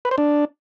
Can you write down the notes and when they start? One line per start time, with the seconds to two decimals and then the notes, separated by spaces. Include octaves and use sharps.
0.05 B4
0.11 C5
0.18 D4